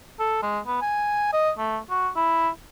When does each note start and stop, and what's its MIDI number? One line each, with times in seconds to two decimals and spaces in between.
0.19 0.41 69
0.43 0.59 56
0.66 0.81 59
0.82 1.29 80
1.33 1.50 75
1.58 1.79 57
1.90 2.09 66
2.16 2.49 64